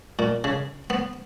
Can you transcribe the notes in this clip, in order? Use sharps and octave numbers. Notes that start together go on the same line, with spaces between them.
A#2
C#3
B3